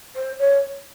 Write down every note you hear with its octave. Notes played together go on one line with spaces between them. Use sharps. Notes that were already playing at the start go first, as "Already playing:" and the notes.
C5
C#5